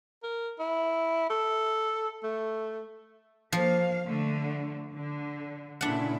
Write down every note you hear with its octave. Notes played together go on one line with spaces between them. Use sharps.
A#4
E4
A4
A3
F3 A#3 F5
D3 A3
D3
A#2 C#3 D4 E4 F#5